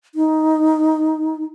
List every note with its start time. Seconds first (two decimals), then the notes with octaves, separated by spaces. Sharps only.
0.15 D#4